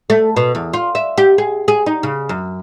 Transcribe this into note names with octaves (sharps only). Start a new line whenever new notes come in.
A3
B2
E2
F4
E5
G4
G#4
G#4
D#4
C#3
F#2